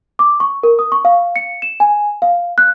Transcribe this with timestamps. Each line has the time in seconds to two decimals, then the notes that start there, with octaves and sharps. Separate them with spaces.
0.19 D6
0.40 C#6
0.63 A#4
0.79 D#6
0.92 C#6
1.05 F5
1.36 C#7
1.62 E7
1.80 G#5
2.22 F5
2.58 F#6